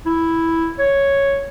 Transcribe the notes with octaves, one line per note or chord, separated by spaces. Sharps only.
E4
C#5